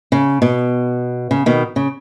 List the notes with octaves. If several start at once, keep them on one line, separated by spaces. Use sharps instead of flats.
C#3
B2
C#3
B2 D#3
C#3